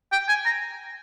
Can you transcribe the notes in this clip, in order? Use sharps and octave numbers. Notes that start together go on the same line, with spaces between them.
G5
G#5
A#5